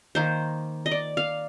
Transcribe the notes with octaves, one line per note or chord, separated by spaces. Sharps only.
D#3 A#3 C5
D#5
D5
F5